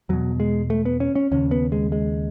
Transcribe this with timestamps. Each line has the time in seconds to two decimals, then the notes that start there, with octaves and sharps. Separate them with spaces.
0.09 E2 B2 F#3
0.40 G#3
0.70 A3
0.85 B3
1.00 C#4
1.15 C#4
1.31 D#2 C#3 C#4
1.51 B3
1.72 G#3
1.92 G#3